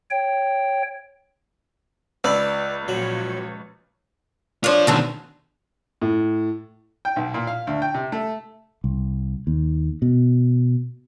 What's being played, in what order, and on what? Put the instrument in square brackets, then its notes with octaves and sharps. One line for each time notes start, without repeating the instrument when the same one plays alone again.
[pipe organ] C#5 G5
[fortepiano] C#2 B4 E6 [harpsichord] D5
[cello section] A#2 F3 C#5 [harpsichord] F#3
[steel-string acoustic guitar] D4 C#5 [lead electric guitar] F4 C5
[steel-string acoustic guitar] G#2 D3 A3 [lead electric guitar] B2 D#3
[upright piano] A2
[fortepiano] G5
B1
A#2
F5
D2
G5
C3
A3
[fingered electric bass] C2
D#2
B2